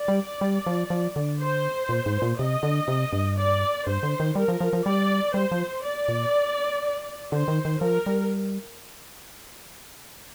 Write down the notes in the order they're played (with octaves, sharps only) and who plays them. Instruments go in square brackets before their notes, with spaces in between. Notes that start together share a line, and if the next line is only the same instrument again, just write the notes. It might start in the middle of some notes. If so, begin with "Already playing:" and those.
Already playing: [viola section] D5
[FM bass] G3
G3
F3
F3
D3
[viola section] C5
[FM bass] A#2
G#2
A#2
[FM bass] C3 [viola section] D#5
[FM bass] D3
C3
G2
[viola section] D5
[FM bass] G2 [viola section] C5
[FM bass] D3
D#3
[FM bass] G3 [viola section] A#4
[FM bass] F3
F3
F3
[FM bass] G3 [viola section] D5
[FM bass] G3 [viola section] C5
[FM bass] F3
[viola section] D5
[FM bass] A#2
[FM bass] D3 [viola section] C5
[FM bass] D#3
D#3
[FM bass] F3 [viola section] A#4
[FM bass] G3